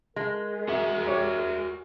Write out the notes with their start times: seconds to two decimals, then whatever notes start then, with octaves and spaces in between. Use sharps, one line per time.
0.16 G#3 A#4
0.69 F#4 E5
1.07 G4 C#5 D5